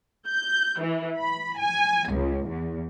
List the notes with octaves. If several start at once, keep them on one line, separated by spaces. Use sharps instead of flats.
G6
E3
B5
G#5
C#2
E2